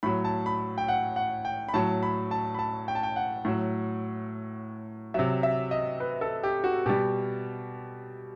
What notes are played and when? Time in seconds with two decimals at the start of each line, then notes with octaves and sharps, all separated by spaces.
0.03 A2 F#3 B5
0.24 A5
0.46 B5
0.78 G5
0.88 F#5
1.16 F#5
1.45 G5
1.69 B5
1.74 A2 F#3 A5
2.03 B5
2.31 A5
2.55 B5
2.59 A5
2.88 G5
2.95 A5
3.03 G5
3.16 F#5
3.45 A2 F#3
5.14 C3 F#3 E5
5.43 E5
5.71 D#5
6.00 B4
6.21 A4
6.43 G4
6.64 F#4
6.86 B2 G3 G4